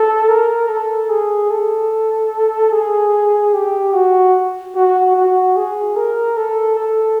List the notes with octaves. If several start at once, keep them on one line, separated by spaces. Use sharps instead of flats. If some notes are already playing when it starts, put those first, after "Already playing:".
Already playing: A4
A#4
A4
G#4
A4
G#4
G4
F#4
F#4
F#4
G#4
A#4
A4
A4